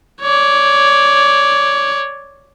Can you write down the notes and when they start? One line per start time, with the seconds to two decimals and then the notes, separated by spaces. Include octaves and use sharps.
0.21 C#5 D5